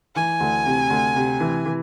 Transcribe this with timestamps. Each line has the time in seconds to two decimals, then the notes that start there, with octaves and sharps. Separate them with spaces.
0.15 E3 G#5
0.40 D2
0.66 C3
0.90 D2
1.16 C3
1.40 E3
1.66 E3